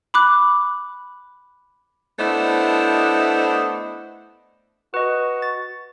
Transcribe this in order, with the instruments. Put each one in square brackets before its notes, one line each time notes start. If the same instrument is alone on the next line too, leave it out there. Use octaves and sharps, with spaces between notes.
[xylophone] B5 D6 F#6
[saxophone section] A3 B3 D4 E4 C5 D#5
[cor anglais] F#4 [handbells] B4 D#5
[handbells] A6